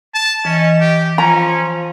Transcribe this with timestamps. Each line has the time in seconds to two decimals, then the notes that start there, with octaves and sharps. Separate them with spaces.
0.14 A5
0.45 E3 C#4 D#5
0.80 G4
1.18 F3 C#4 A#5